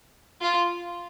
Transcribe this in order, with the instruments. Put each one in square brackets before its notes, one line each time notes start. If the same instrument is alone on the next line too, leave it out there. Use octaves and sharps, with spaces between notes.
[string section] F4